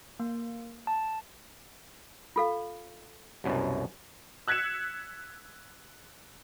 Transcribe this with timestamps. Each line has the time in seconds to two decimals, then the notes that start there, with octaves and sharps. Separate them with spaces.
0.20 A#3
0.87 A5
2.36 F4 A4 F5
3.44 C2 F#2 B2
4.48 E6 F#6 G#6 B6 C#7 E7